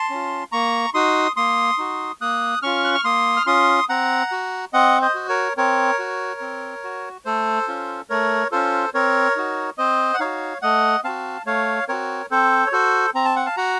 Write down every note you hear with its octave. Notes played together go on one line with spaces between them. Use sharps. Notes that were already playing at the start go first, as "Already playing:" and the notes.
Already playing: A5 C6
C#4 F4
A#3 A#5 C#6
D#4 F#4 C6 D#6
A#3 C6 D#6
D#4 F#4
A#3 D#6 F#6
C#4 F4 C#6 F6
F#6
F6
A#3 C6 D#6
F6
C#4 F4 C6 D#6
C4 F#5 A#5
F#4
C4 D#5 F#5
C5 D#5
F#4
A#4 C#5
C4 A#4 C#5
F#4
C4
F#4
A3 A4 C5
C#4 F4
A3 A#4 C#5
C#4 F4 A4 C5
C4 A#4 C#5
D#4 F#4
C4 C5 D#5
F#5
D#4 F#4 C#5 F5
A3 D#5 F#5
C4 F#4 F5 A5
A3 C#5 F5
C4 F#4 A#4 C#5
C4 A4 C5
C#5
F#4 A4 C5
C4 A#5
A5
F#5
F5 A5
F#4 F#5 A#5